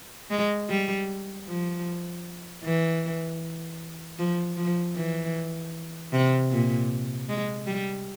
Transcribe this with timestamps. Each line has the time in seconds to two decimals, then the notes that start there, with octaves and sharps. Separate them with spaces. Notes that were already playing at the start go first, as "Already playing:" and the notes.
0.31 G#3
0.70 G3
1.47 F3
2.64 E3
4.19 F3
4.57 F3
4.95 E3
6.13 C3
6.51 A#2
7.29 G#3
7.67 G3